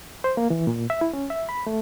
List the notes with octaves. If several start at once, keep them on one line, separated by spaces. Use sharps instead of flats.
C5
A#3
E3
A#2
E5
E4
C#4
E5
B5
A3